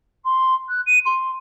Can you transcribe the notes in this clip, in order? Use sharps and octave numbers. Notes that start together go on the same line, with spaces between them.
C6
F#6
D#7
C6